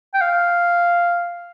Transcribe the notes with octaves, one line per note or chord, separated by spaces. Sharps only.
G5
F5